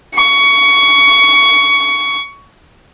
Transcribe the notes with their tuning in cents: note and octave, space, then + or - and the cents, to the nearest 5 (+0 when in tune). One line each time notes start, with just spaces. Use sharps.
C#6 +20